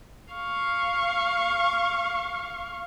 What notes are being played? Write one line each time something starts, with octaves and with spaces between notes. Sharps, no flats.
F5 C#6